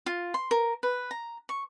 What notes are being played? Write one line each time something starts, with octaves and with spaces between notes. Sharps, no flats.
F4
C6
A#4
B4
A#5
C#6